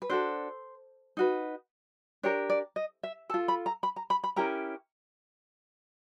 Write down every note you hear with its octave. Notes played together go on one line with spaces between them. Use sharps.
B4
D4 F#4 A4 C5
D#4 F#4 B4
D4 G4 A#4 C#5
D5
D#5
E5
F4 A4 A5
B5
A#5
B5
A#5
B5
B5
C#4 E4 G4 A#4 A#5